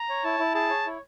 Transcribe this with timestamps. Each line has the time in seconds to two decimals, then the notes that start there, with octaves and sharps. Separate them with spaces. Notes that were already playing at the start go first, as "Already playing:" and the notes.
Already playing: A#5
0.09 C#5
0.24 E4 A5
0.39 E4
0.55 G#4 A5
0.70 C#5
0.86 E4